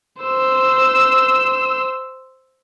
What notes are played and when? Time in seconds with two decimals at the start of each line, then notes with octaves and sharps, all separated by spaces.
0.21 C5 E6